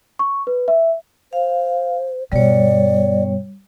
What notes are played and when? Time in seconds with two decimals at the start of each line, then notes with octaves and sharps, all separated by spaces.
0.19 C#6
0.47 B4
0.68 E5
1.33 C5 F5
2.32 G2 B2 G3 C#5 D5